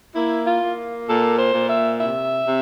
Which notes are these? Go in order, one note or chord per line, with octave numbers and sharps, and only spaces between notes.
A#3 E4
F4
A#3
A#2 A4
C5
A#2
E5
C3 E5
C3